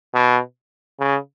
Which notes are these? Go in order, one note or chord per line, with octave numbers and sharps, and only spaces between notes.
B2
C#3